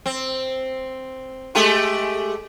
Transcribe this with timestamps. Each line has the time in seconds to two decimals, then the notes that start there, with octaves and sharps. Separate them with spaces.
0.06 C4
1.55 G#3 A3 G4